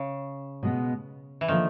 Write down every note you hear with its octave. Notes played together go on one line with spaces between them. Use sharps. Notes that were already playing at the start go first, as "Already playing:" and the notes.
Already playing: C#3
B2 G#3 B3
E3
D3 D#3 F3 A#3